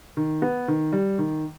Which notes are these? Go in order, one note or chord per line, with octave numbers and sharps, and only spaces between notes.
D#3
B3
D#3
G3
D#3